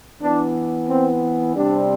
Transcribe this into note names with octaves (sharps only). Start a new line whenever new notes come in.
E3 B3 D4
C4
C3 G3 C4 D4